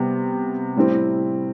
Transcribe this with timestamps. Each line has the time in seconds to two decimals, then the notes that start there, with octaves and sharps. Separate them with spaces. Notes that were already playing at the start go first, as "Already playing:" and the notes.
Already playing: C3 G3 B3
0.76 A2 G3 C4 E4